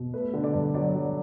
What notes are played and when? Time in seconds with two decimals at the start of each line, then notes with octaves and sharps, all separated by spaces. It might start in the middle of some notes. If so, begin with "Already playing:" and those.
Already playing: B2
0.14 A3 B4
0.33 D3
0.44 D5
0.54 G2
0.74 F#3 D5
0.94 F#3